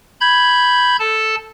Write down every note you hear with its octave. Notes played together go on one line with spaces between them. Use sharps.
B5 G6 G#6
A4 A5